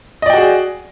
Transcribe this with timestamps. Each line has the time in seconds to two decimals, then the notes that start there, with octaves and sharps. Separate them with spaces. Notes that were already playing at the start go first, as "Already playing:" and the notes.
0.22 D#5
0.26 D5
0.30 G5
0.33 F#4
0.37 G#4